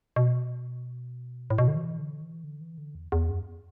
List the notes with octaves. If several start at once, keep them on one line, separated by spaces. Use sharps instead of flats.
B2
A2
B2
D3
E3
D3
E3
D3
E3
D3
E2
E2
F#2